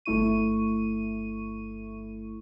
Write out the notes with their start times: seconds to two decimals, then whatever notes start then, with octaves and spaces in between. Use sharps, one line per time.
0.05 G1 A3 E4 C#6 D#7